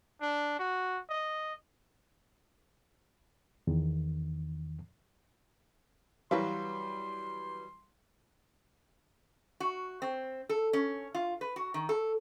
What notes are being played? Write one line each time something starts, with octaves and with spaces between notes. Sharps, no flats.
D4
F#4
D#5
E2 D#3
E3 F#3 G3 B4 F5 C6
F#4
C4
A4
C#4
F4
B4
F#4
D#3
A4